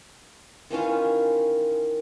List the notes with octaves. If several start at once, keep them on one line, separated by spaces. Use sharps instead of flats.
D#3 E3 C#4 F4